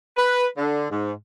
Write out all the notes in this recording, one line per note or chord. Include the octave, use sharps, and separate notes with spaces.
B4
D3
G#2